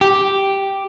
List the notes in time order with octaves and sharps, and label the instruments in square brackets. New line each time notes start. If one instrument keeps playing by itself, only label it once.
[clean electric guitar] G4